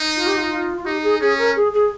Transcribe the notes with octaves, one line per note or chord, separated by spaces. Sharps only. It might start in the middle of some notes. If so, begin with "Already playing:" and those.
Already playing: D#4
F4
G4
F4
F4
F4
D#4 G4
G#4
C#4 G#4
A#4
G#4
G#4